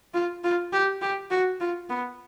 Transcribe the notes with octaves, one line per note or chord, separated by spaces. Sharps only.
F4
F4
G4
G4
F#4
F4
B3